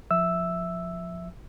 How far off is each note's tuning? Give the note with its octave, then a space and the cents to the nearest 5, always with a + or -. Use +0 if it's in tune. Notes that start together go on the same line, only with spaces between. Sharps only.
F3 +15 E5 +0 E6 +0